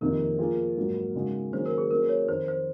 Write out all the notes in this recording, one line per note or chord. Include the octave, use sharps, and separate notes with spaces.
F2 C3 D#3 A#3 A#4
F3 A#3 F4 G#4
G#2 F#3 A#3
C#3 G#3 D#4 F#4
D#3 F#3 A#3 C#4 G#4 C5
A#4
G#4
F#3 A#3 C#4 A#4
C#5
F2 D#3 A#3 D#4 A#4 C5
C5